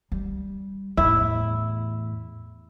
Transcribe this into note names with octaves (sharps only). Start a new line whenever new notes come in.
G3
E2 A2 E4